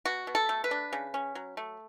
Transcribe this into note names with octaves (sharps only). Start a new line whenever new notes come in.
B2 F#4
B2
A4
A3
B4
D4
C#3
C#4
F#3
A3